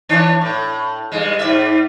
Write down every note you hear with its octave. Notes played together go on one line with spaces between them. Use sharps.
E3 D4 C#5
A2
G2 G#3
G#2 D5 E5